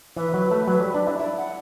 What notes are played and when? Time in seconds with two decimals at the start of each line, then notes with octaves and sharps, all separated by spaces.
0.17 E3 B4
0.34 F#3
0.51 A3
0.68 F#3
0.81 G3
0.94 D4
1.07 E4
1.20 E4 D5
1.37 F#5